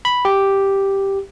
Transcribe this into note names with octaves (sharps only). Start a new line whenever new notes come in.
B5
G4